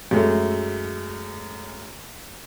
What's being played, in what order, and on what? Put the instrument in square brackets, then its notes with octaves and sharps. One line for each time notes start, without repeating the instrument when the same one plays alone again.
[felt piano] F#2 G#3 A3